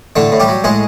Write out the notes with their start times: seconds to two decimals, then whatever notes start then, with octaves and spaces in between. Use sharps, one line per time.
0.16 A2 D3 D4
0.32 A2
0.40 G3 G4
0.48 F#3
0.64 A2 G#3 G#4